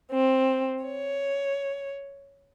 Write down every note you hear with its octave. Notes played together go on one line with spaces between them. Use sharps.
C4
C#5